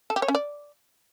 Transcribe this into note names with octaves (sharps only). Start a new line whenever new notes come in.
A4
G4
C#5
C#4
D5